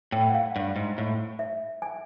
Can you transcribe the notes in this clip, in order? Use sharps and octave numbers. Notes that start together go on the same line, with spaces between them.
A2 G5
F#5
F5
G2
G#2
A2
E5
G#5